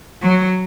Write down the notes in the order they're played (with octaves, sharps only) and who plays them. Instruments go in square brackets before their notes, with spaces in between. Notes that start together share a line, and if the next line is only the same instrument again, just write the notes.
[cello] F#3